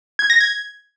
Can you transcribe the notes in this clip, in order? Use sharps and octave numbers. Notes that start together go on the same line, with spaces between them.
G#6
A#6
G#6